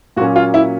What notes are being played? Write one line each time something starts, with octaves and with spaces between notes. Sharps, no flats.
A#2 F#3 A#3 C#4 F#4
F4
E4